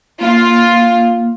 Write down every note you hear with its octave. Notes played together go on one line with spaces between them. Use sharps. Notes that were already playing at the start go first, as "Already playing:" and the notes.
A#3 F4